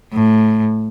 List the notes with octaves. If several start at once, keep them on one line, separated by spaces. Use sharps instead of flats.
A2